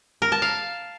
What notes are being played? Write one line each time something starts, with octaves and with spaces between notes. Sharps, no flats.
A#4
A5
F5